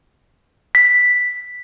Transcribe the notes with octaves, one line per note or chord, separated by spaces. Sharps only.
B6